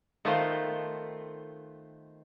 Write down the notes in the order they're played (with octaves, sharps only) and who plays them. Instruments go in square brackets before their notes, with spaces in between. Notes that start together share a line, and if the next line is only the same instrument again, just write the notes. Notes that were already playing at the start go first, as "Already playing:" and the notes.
[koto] D#3 A3 B3 C4 F4 C5